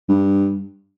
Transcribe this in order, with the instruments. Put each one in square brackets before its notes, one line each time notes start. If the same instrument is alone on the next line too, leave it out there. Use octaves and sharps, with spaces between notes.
[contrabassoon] G2